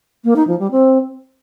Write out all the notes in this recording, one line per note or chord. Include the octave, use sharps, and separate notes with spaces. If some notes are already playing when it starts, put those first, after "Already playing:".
A#3
D#4
F3
G3
C4